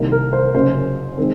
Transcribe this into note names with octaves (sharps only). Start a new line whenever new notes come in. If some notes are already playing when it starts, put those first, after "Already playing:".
Already playing: C2 C3 D#3 A#3
A#4
C5
F#1 F#2 C#3 C5
D#3 G#3 C4